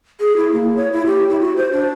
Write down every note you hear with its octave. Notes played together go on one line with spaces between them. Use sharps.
G#4
E4
A#3
C#5
E4
G4
E4
F#4
C5
D4